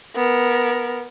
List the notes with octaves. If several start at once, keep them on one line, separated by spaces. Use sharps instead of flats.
B3 A#4